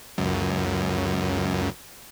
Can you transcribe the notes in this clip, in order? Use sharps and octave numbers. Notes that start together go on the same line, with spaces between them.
C#2 F#2